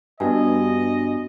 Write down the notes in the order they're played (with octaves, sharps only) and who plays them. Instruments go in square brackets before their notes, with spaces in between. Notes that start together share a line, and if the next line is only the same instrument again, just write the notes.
[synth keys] G2 [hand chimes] B3 F#4 G#5 [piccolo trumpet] D#5